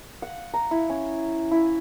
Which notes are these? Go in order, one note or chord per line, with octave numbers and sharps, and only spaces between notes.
F#5
A#5
E4
C#4
E4